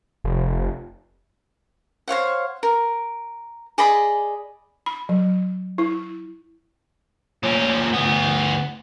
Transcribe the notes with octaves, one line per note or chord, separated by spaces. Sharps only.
F1
C5 C#5 F5 F#5
A#4
G#4 D5 D#5 B5
B5
F#3
E4
A#2 C#4
D2 B3